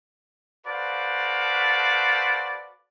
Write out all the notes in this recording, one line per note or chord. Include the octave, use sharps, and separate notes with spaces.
F#4 A4 B4 C5 D5 F5